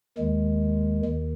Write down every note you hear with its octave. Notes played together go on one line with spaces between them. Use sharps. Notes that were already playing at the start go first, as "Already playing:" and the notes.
D#2 D#3 G#3
D#2 D#3